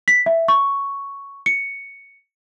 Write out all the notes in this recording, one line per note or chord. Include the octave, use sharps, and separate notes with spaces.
B6
E5
C#6
C#7